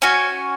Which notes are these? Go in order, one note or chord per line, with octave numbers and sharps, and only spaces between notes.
C#4 F#4 G#5